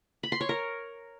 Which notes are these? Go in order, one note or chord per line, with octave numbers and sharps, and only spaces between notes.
B5
C6
C#5
A#4